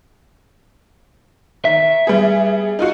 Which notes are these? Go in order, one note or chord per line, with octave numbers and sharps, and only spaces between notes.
D#3 E5
G3 B3 G#4
D#4 F4 F#4